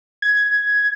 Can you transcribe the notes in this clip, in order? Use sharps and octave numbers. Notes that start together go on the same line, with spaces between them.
G#6